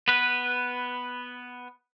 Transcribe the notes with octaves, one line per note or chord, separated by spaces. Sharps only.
B3 B4